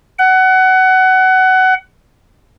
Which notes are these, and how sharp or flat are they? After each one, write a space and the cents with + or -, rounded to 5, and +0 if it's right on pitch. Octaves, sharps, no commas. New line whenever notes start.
F#5 +20